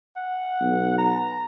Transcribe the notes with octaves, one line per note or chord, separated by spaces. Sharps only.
F#5
B1
A#5